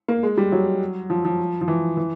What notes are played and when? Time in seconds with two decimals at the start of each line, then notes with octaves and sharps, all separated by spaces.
0.08 A#3
0.23 G#3
0.37 G3
0.52 F#3
1.10 F3
1.25 F3
1.61 F3
1.68 E3
1.97 E3